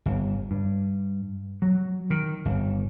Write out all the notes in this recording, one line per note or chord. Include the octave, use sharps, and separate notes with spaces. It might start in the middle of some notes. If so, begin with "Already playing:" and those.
G1
G2
F#3
D#3
G1